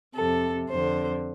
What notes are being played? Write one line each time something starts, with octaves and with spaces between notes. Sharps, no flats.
F2 C3 A4
F2 D3 C5